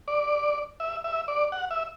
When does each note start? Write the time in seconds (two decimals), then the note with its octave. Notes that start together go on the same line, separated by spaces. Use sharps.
0.08 D5
0.80 E5
1.04 E5
1.28 D5
1.52 F#5
1.71 E5